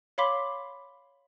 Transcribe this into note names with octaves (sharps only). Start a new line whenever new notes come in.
C#5 F5 B5 C6 D6 B6